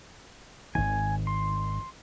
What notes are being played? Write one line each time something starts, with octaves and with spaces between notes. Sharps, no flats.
G#1 D#3 G#5
C6